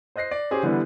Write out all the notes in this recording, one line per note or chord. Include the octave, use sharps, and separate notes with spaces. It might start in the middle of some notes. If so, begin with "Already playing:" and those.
C5 D#5 F#6 A#6 C7
D5
C#4 G4 G#4 C5
D3 E3 G3 B3 D4 E4